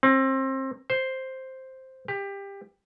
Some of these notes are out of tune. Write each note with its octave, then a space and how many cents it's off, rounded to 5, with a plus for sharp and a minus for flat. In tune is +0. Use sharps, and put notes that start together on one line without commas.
C4 +30
C5 +5
G4 +20